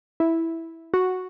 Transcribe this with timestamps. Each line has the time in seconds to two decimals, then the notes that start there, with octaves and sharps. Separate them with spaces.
0.20 E4
0.94 F#4